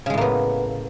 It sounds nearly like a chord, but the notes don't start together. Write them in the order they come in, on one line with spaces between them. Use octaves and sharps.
C#3 G#3 A2 A#3 B3